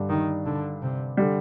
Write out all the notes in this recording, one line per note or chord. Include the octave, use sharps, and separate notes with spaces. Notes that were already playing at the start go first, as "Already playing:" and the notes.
Already playing: G2 D3 G3 D4
D#3
D3
C3
D3 G3